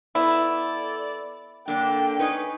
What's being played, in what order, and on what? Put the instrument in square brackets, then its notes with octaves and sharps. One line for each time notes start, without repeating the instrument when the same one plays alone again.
[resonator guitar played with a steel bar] B3 [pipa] E4 [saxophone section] A4 D5
[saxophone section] D3 A#3 [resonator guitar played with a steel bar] D4 [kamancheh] G5
[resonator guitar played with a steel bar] C#4 D#4 B4